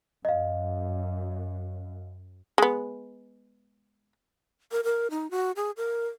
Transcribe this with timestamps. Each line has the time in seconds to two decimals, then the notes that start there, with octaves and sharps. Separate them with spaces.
0.25 F#2 D#5 F5
2.58 G#3 B3
4.72 A#4
4.84 A#4
5.11 D#4
5.31 F#4
5.56 G#4
5.77 A#4